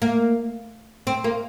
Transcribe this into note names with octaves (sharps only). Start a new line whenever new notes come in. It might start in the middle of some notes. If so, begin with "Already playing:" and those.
A#3
C4
A#3